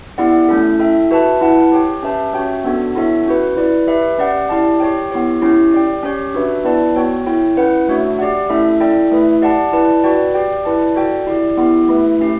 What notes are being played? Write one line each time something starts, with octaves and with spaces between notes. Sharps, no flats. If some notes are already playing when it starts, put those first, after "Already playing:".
B3 E4 G4 D5 F#5
A3 C#4 E4 A4
E4 A4 E5 G5
F#4 B4 E5 A5
E4 B4 F#5 A5
G4 C#5 G5
C#4 G4 B4 E5 A5
C#4 F#4 C#5 E5 G5
B3 D4 F#4 A4
B3 E4 A4 C#5 E5
C#4 F#4 B4
E4 B4 D5
G4 B4 E5
C#4 G4 D5 F#5
E4 G4 D5 A5
G4 C#5 G5
B3 E4 G4 C#5
C#4 E4 G4 C#5
G4 D5 G5
C#4 G4 C#5
D4 F#4 B4 E5
B3 E4 B4 D5 A5
B3 F#4 C#5 G5
E4 A4 C#5 G5
C#4 E4 B4 F#5
A3 D4 F#4 C#5 E5
G4 D5 F#5
A3 C#4 E4 A4 E5
E4 A4 D5 G5
A3 E4 B4 E5
G4 D5 F#5 A5
E4 B4 D5 A5
F#4 B4 D5 G5
G4 D5 G5
E4 B4 D5 A5
F#4 A4 D5 G5
E4 G4 D5
B3 E4 G4
A3 E4 B4 E5
A3 C#4 G4